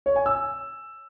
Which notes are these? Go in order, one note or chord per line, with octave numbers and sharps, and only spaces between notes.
C#5
G#5
E6